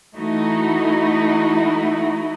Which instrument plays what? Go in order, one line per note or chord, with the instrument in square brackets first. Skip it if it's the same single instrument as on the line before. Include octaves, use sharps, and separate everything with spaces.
[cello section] E3 A3 D#4 E4 F#4